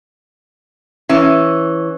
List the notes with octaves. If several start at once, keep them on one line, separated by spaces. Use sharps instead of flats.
E3 C#4